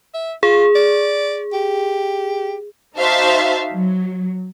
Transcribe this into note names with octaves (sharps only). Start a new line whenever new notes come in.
E5
F4 G#4
D5
G4
D#4 F#4 C5 E5 F5 A5
F#3